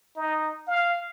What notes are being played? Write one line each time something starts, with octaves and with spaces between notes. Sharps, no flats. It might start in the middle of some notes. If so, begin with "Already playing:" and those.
D#4
F5